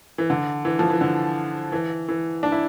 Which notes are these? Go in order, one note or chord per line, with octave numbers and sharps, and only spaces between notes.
E3
D3
E3
F3
E3
D3
E3
E3
D4
E4